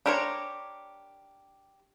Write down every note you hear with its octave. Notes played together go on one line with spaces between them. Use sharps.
D4 G4 A#4 C5 C#5